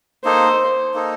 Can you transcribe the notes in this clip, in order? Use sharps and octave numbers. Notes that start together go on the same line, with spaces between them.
A#3 D#4 A4 C5
A#3 D#4 A4